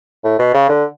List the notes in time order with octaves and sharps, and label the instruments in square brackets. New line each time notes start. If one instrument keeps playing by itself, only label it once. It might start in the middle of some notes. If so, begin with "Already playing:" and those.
[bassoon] A2
B2
C#3
D3